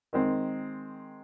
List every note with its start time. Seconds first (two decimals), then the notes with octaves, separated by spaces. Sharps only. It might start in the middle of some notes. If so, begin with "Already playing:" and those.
0.13 D#3 G#3 C4